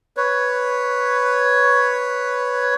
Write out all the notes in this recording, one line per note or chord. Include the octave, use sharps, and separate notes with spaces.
B4 C#5